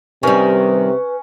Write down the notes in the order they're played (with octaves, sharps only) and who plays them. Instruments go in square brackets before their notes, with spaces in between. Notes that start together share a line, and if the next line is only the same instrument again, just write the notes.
[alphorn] C3 [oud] D#3 G3 [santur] C#4 [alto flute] B4